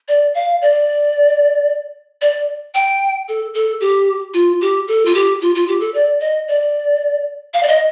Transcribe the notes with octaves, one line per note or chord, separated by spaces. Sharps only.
D5
F5
D5
D5
G5
A4
A4
G4
F4
G4
A4
F4
G4
F4
F4
G4
A4
D5
D#5
D5
F5
D5
D#5